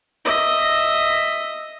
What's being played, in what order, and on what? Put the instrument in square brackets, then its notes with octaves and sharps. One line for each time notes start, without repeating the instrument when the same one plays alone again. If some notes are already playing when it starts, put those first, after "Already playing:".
[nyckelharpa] D#5 E5